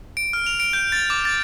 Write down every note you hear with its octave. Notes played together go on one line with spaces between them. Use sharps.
D7
F6
F7
D7
G6
A6
D6
A6